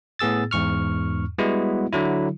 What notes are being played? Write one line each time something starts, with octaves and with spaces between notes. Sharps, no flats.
A2 B3 G#4 E6 A6
E2 G#2 C#6 F6
G3 G#3 B3 E4 F#4
D3 F#3 E4